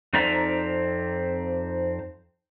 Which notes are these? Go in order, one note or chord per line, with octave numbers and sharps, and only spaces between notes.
F2 C4 D#4 D5 E5 A#5